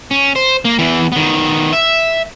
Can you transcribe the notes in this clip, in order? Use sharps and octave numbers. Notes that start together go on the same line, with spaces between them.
C#4
C5
A#3
E2 E3
D#3 B3
E5